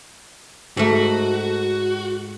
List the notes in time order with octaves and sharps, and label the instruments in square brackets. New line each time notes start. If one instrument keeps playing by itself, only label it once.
[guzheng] G#2 A3 [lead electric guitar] F#4